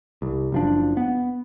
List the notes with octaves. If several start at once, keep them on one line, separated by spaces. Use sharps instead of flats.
C2
F#1 F3 D4
B3